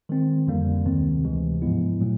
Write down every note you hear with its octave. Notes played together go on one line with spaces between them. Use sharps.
D#3 G#3 C4
F2 D3 G3 A#3
D2 C3 D#3 G#3 C4
D2 C3 E3 G#3
G#2 F3 G#3 B3 E4
A#2 F#3 A3